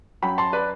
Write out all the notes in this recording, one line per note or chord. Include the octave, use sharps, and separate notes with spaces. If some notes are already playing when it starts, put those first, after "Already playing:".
F#2 F#3 G5 B5
A5 C6
B4 D5